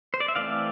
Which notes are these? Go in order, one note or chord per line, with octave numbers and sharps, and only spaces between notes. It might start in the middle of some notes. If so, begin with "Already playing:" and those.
C5
D5
E5
E3 A3 C4 D5 F5